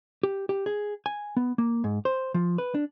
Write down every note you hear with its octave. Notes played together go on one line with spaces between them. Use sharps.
G4
G4
G#4
G#5
B3
A#3
G#2
C5
F3
B4
D4